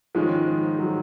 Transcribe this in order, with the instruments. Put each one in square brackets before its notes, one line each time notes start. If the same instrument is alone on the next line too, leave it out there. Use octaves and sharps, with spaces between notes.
[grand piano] G#2 D#3 G#3 C#4 [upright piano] F3
[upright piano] F#3